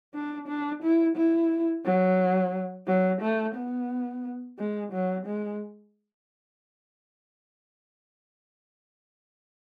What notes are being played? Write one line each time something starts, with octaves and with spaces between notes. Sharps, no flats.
D4
D4
E4
E4
F#3
F#3
A3
B3
G#3
F#3
G#3